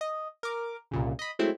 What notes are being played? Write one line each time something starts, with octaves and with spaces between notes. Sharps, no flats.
D#5
A#4 D6
C2 A#2 C#3
D#5 B5
F#3 G#3 A3 C4 E4